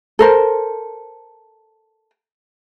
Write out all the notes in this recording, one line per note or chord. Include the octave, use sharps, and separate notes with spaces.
A4 A#4 C5